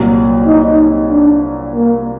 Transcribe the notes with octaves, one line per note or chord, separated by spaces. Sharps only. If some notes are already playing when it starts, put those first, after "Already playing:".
Already playing: C2 A#2 F#3
D#4
D4
A#3